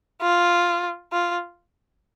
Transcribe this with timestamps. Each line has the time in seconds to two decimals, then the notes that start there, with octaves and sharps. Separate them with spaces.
0.22 F4
1.13 F4